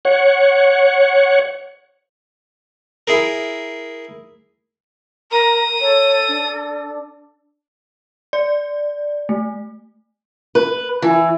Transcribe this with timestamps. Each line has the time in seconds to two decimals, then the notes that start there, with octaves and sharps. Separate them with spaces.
0.05 C#5 F#5
3.08 E4 G#4 A#4
5.32 A#4 A#5 D#6
5.80 A4 C#5
6.28 D4
8.33 D5
9.29 A3
10.55 B4
11.02 E3